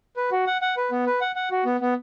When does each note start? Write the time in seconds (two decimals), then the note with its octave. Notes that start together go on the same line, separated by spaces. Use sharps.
0.16 B4
0.31 F#4
0.47 F#5
0.62 F#5
0.77 B4
0.91 B3
1.06 B4
1.21 F#5
1.36 F#5
1.51 F#4
1.65 B3
1.81 B3